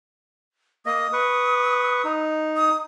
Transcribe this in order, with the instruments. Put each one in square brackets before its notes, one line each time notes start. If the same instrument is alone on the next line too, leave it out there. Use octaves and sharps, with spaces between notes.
[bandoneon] A#3 D#5 [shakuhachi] D#6
[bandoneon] B4 C#6
D#4
[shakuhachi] D#6